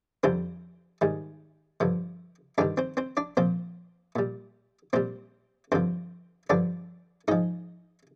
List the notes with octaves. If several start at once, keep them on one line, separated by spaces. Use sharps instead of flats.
F2 D3 G3 C4 C5
G#2 D#3 G3
G2 D3 F3
G2 D3 D#3 G3 D4
C4 C5
C4 C5
D4 D5
A#2 F3 C4 C5
A#2 G3
A#2 G3 C4 C5
G2 D3 F3 C4 C5
G2 D3 F3 D4 D5
G#2 F3 D#4 D#5